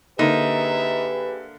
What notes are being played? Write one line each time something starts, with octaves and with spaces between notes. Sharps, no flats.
D3 A#3 D#4 G4 G#4 B4 E5